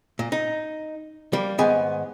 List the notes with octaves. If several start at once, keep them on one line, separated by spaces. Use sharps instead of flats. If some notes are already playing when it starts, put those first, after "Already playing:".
A#2
D#4
G3 A#3
G#2 D#3 B3 G#4 G#5